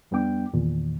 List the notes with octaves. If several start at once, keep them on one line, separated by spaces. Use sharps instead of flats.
F2 G3 B3 D4 G5 D6
E2 A#2 D#3